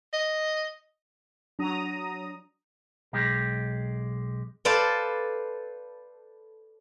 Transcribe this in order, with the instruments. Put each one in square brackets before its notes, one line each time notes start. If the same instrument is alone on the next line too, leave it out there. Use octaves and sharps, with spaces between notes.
[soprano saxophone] D#5
[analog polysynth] F#3 A#5 D#6 [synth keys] D4
[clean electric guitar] B1 G#3 G4
[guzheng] A4 B4 C5 D5 F5 A5